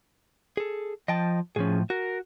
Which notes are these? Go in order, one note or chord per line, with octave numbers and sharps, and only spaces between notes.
G#4 A4
F3 D#5 G5 A5
A2 F3 C#4 G#4
F#4 A#4